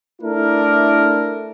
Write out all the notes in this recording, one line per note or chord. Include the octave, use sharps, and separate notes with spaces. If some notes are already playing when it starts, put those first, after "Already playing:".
A3 D4 E4 A4 A#4